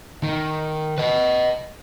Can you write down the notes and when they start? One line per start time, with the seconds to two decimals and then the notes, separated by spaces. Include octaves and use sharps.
0.23 D#3
0.98 B4 D#5